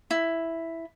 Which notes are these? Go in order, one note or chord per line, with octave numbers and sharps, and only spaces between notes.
E4